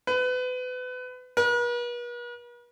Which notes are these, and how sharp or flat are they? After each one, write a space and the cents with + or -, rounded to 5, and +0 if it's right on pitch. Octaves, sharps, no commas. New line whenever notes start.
B4 +30
B4 -45